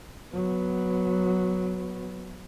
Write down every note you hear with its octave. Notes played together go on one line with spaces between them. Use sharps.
F#3 B3